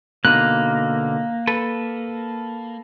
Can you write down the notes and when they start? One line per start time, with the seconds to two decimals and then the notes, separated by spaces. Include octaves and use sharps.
0.25 B2 D3 A#3 D#4 F#6
1.47 A4 B4